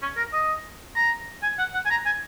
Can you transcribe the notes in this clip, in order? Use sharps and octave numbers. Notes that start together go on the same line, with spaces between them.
C#4
A#4
D#5
A#5
G#5
F#5
F#5
G#5
A#5
G#5